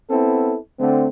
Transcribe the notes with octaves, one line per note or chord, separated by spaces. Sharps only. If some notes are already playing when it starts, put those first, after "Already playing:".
B3 C4 E4 A4
D3 A3 C4